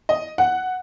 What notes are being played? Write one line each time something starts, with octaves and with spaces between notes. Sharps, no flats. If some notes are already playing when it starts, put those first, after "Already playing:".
D#5
F#5